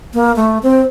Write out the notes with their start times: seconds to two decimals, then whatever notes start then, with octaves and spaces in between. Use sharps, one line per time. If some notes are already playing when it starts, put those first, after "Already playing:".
0.14 A#3
0.36 A3
0.63 C4